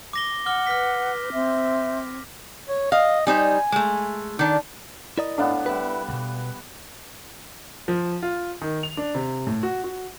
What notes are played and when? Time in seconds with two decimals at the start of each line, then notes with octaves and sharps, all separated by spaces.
0.13 D6 A#6 G7
0.46 F#5 D6 F6 G7
0.67 B4 F6 B6
1.33 C4 E5
2.69 C#5
2.92 D#5 F5
3.27 G3 D#4 C5 G#5
3.72 G#3 A3
4.39 D#3 D4 D#4
5.18 E4 A#4 D5 D#5
5.38 A2 B3 D4 F5 F#5
5.66 G3 B3 E4 B4
6.09 C2 B2
7.88 F3
8.23 F4
8.62 D#3
8.83 F7
8.97 D4
9.15 C3
9.47 A2
9.63 F#4
9.84 F#4